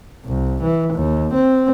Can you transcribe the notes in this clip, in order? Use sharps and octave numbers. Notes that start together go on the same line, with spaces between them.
C2
E3
D#2
C4